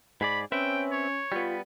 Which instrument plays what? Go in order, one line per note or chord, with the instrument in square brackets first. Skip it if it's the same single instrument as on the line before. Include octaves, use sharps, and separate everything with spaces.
[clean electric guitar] G#2 G#4 D5 [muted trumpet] B5
[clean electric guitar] C4 B4 E5 [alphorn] C#4 [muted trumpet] G5
[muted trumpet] C#5
[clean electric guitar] G3 B3 [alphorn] F4